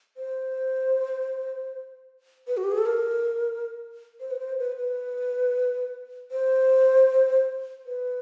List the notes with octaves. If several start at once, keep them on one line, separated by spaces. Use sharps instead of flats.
C5
B4
F#4
G4
G#4
A4
A#4
C5
B4
C5
B4
B4
C5
B4